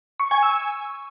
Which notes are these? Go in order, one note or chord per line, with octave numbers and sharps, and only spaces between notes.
C#6
G#5
E6